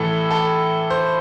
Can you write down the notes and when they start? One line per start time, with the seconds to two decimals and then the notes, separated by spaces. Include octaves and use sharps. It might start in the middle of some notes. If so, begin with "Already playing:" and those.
Already playing: A2 E3 A4
0.31 A4
0.90 C5